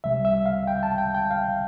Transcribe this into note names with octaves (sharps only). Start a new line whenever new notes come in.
C2 C3 G3 E5
E5
F5
G5
A5
G5
G5
F5